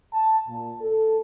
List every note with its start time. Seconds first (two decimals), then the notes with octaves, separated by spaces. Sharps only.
0.13 A5
0.48 A#2
0.81 A4